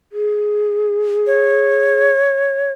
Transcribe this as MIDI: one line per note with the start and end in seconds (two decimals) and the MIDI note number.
0.12 2.09 68
1.27 2.73 73